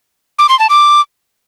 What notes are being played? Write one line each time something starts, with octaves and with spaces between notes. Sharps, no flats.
D6
C6
A5
D6